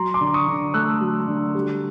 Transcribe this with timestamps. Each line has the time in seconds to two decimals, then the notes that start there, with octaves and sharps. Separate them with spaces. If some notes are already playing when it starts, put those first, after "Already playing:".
Already playing: F#3 A#5 C6
0.14 C6 D6
0.21 D3
0.34 C#6 D#6
0.48 D3
0.74 A3 E6 F#6
1.01 F#3
1.28 D3
1.55 G3